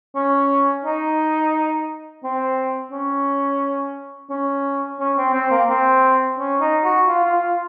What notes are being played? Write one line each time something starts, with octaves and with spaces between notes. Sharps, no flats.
C#4
D#4
C4
C#4
C#4
C#4
C4
C4
A#3
C4
C#4
D#4
F#4
F4
F4
F4